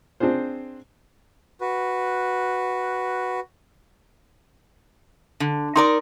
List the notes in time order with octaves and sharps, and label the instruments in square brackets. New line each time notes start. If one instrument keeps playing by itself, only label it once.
[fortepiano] C4 D4 F4 G#4 C5
[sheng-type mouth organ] F#4 B4
[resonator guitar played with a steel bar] D3
[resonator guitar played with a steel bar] D#4 A#4 D5 [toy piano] C6